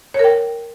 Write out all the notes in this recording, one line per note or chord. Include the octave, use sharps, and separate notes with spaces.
A#4 C#5 G5